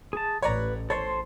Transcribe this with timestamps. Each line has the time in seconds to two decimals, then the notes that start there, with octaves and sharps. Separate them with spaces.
0.13 G#4 A5
0.42 A1 B4 C#5 D5 A#5
0.90 A4 C5 C#5 C6